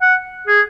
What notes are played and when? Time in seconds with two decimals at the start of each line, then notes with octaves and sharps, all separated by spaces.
0.01 F#5
0.47 G#4